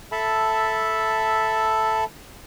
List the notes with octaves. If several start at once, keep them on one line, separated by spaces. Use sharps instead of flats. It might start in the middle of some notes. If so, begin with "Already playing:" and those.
A4 E5 A5 B5